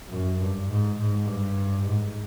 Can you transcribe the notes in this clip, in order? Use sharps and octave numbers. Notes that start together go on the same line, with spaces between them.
F#2
G2
G#2
G#2
G2
G#2